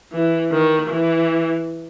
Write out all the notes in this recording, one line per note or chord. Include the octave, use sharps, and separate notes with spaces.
E3
D#3
E3